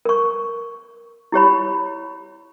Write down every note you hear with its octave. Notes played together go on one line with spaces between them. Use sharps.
A#4 C#6
E4 G4 C#5 B5